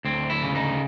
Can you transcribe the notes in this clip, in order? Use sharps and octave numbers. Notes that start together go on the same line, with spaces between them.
D2 C4
E4
C#3
D#4